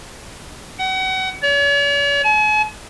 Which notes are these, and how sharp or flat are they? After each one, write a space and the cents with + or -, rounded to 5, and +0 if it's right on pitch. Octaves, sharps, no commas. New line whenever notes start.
F#5 +35
C#5 +45
G#5 +45